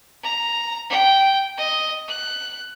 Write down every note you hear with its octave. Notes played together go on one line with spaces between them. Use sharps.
A#5
G5
D#5
F#6